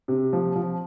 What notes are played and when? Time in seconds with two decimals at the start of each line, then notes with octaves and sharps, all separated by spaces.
0.08 C3
0.33 F3
0.56 F3